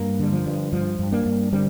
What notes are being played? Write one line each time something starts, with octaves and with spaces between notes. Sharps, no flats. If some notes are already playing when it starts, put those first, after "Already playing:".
Already playing: G2 A#3
D3 G3
F3
G2
G2 F3
G2
A#3 D4
G2
D3 G3 C4